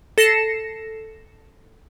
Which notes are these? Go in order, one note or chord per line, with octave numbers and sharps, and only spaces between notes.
A4 A#6 C7 C#7 E7